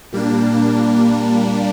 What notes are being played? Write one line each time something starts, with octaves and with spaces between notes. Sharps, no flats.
A#2 G3 A#3 D4